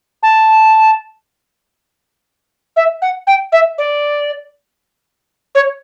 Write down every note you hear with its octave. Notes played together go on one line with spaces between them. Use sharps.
A5
E5
F#5
G5
E5
D5
C#5